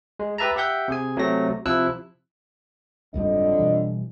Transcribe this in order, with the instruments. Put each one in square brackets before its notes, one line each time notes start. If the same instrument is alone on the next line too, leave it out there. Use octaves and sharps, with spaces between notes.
[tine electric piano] G#3
G4 B4 E5 A5 A#5
G4 E5 F#5 G6
C3 G#4 G#5
C3 F#3 A3 A#6
C3 F3 E4 E6 F#6
[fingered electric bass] F#1 G#2 G3 [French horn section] F2 D3 D#5
[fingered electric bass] B2 E3 G3